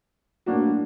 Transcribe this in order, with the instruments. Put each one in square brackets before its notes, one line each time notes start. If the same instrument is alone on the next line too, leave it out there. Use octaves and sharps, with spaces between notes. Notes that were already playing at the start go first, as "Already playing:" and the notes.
[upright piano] A2 F#3 A#3 D4 F#4